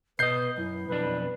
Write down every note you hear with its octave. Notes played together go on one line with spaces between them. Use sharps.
B2 B4 D#5 G6 C7
F#2 E4
B1 F2 D4 B4